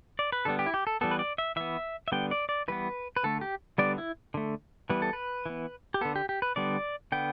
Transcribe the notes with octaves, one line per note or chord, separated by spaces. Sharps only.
D5
B4
D3 G3 B3 A4
G4
E4
G4
A4
E3 G3 B3 A4
B4
D5
E5
E3 B3 E5
E5
D3 G3 B3 G5
D5
D5
E3 G3 B3 B4
B4
D3 A3 A4
G4
D3 G3 B3 D5
E4
D3 A3
E3 G3 B3 B4
A4
B4
E3 B3
G4
D3 B3 A4
G4
G4
B4
D3 G3 B3 D5
D3 B3 G5